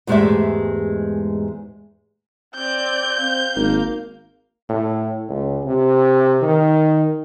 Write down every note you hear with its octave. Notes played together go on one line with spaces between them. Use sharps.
E2 G#2 G#3 A3 G4 E5
C4 D5 G6
C4 F5
G#1 A#3
A2
C#2
C3
D#3